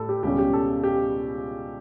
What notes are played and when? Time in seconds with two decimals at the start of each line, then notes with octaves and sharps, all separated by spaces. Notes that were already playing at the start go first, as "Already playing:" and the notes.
Already playing: A2 G3 A4
0.09 G4
0.23 C#2 B2 G3 C#4 G4
0.38 G4
0.53 A4
0.84 G4